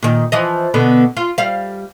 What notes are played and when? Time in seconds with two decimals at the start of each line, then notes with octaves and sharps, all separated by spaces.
0.03 A#2 D#3
0.32 E3 F3 D#5
0.74 B2 D3 B3
1.17 F4
1.38 G3 F5